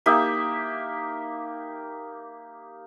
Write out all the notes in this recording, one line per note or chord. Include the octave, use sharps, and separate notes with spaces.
A#3 D#4 G4 E5